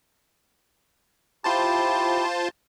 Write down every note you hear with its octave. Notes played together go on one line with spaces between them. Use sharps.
E4 F4 G4 C5 A5